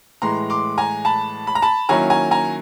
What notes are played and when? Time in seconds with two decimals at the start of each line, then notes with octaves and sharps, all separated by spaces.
0.22 A2 E3 G#3 A#5 C6
0.50 C6 D6
0.78 G#5 A#5
1.05 A5 B5
1.47 B5
1.55 A#5
1.62 A5 B5
1.89 D#3 F#3 A#3 C#4 E4 G#5 A#5
2.10 G#5 A#5
2.31 G#5 A#5